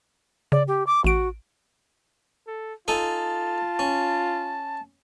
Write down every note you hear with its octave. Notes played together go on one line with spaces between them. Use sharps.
C#3 D5
G4
D6
A1 F#4 D7
A4
D#4 F4 A4 G#5 A5
C#4